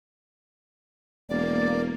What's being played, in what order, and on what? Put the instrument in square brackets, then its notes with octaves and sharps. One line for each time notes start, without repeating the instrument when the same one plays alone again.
[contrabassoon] E1 [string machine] A#3 [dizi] D5